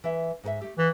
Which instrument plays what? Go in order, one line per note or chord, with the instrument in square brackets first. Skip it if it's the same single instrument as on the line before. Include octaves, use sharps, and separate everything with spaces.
[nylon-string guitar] E3 E5
G#2 A#4 E5
A3 G4
[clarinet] E3 [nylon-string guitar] F4